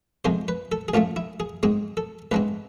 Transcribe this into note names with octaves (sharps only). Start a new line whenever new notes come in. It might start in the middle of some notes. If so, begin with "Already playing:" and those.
F2 C3 G#3 C5
B4
A4
G#4
A1 A2 F3 A3 F4
E4
G#4
G#2 G#3 C4 G#4
A4
A1 G#2 G#3 C4 B4